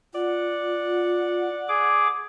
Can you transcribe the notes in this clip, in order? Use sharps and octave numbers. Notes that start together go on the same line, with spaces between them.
F4 D5 F#5
G#4 D6